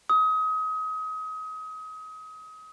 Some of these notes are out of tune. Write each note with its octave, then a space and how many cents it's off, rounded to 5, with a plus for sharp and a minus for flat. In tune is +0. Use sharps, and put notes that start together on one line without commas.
D#6 +30